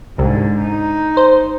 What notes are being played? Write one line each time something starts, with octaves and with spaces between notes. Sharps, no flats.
C2 G#2 D3
D#4
C5